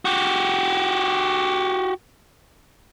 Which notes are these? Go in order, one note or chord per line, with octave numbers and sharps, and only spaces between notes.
F#4 G4